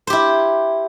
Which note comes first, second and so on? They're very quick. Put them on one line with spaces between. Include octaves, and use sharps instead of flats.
C5 G4 E4